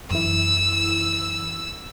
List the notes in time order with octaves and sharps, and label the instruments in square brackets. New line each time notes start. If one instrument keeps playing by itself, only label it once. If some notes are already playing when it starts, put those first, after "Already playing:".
[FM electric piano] F#2 E3 E4 [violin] E6